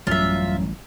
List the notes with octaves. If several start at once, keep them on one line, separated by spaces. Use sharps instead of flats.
A1 F#2 G3 F4 E5